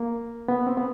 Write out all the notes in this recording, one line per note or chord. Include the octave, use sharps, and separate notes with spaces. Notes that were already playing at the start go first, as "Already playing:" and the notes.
Already playing: A#3
B3
C4
B3